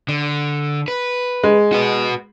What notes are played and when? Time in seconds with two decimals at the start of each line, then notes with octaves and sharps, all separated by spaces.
0.09 D3
0.88 B4
1.43 G#3
1.73 F#4 B4